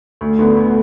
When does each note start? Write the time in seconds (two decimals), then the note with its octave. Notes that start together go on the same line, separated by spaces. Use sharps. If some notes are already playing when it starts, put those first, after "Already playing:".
0.21 D2
0.39 D3 B3
0.56 D2